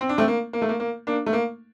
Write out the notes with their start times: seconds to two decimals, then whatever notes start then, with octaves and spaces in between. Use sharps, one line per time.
0.01 C4
0.09 D4
0.18 A3 C4
0.28 A#3
0.53 A#3
0.62 A3
0.69 A#3
0.80 A#3
1.07 A#3 D4
1.27 A3
1.33 A#3